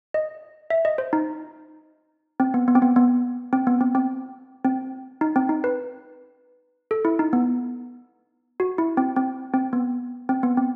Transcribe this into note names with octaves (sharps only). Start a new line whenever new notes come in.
D#5
E5
D#5
C5
D#4
C4
B3
B3
C4
B3
B3
C4
B3
C4
C4
C4
D#4
C4
D#4
B4
A4
E4
D#4
B3
F#4
E4
C4
C4
C4
B3
C4
B3
C4